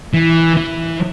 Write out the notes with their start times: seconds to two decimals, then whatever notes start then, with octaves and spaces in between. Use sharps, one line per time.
0.13 E3
0.57 E3